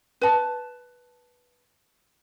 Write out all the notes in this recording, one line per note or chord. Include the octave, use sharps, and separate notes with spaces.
B4 A5